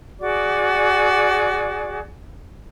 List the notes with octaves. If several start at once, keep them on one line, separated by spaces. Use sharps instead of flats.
F#4 G#4 D5 D6